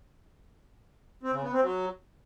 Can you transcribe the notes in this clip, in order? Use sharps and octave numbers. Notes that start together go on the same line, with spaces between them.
C4
C#3
B3
C4
F#3